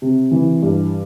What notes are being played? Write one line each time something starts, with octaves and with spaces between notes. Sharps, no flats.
C3
E3
G2